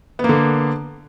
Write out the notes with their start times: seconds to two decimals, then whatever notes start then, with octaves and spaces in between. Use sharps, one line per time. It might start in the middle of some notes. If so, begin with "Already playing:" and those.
0.19 B3
0.24 A#3
0.29 D3